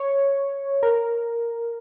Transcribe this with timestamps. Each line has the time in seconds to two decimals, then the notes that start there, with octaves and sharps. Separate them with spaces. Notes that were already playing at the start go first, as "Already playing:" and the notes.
Already playing: C#5
0.83 A#4